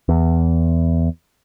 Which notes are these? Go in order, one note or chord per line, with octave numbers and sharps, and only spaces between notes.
E2